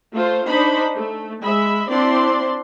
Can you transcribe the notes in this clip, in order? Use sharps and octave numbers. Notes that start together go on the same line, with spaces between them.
A3 F4 C5
D4 D#4 C5 B5
A3
G#3 E5 B5
C4 D4 E4 D5 C6